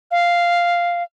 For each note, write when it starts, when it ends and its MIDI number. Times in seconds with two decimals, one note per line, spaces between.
0.11 1.03 77